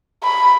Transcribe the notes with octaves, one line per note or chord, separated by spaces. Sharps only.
B5